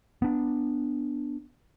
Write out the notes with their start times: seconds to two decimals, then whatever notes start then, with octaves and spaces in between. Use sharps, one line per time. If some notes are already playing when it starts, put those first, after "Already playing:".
0.22 B3 D4